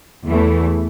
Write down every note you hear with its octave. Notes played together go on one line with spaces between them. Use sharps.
E2 E3 A3